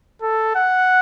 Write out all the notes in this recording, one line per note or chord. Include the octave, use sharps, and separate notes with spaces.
A4
F#5